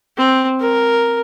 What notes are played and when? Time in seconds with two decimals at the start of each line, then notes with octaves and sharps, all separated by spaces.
0.18 C4
0.60 A#4